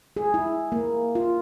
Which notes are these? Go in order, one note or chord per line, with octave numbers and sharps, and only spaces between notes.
G#4
E4
A#3
F4